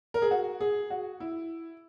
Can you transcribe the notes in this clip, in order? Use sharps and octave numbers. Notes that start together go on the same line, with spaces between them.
A#4
G#4
F#4
G#4
F#4
E4